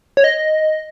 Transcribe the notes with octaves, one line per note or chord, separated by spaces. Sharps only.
C#5
D#5